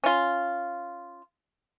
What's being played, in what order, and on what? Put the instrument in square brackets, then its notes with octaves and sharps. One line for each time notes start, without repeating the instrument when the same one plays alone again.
[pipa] C#4 F4